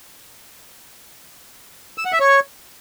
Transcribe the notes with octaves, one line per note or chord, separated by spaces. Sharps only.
E6
F#5
E5
C#5